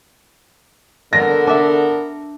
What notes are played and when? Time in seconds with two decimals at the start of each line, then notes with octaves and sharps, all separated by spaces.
1.13 D3 B3 A4 A#4 A#6
1.47 D4 E5